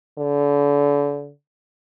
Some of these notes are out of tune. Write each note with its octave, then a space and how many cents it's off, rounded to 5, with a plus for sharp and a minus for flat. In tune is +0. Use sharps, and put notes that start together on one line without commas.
D3 -35